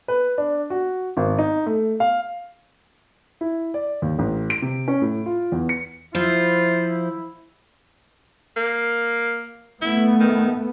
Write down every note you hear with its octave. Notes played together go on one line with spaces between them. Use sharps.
B4
D4
F#4
G#1
D#4
A3
F5
E4
D5
D#2
A1
D7
C3
C#4
A2
F4
E2
C#7
F3 E4 F4 C5
A#3
A3 B3 E4
D#3